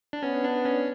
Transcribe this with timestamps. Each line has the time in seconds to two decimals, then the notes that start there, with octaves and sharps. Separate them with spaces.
0.13 D4
0.23 B3 C#4
0.44 D4
0.65 C#4